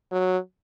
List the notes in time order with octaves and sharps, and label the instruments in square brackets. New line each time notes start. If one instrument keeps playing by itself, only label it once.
[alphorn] F#3